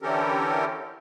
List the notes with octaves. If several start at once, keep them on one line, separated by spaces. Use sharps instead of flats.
D3 E3 C#4 G4 A4 A#4